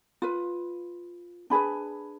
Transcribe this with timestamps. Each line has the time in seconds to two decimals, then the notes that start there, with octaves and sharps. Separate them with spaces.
0.22 F4 B4
1.50 D4 G#4 B4 B5